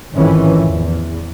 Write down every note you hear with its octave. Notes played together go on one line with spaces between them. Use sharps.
A1 F2 G#2 D#3 E3 C#4
E2